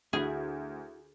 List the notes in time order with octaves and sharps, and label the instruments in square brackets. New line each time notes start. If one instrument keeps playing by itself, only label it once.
[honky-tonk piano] D2 [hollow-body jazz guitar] E4 F#4 E5 [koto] G#4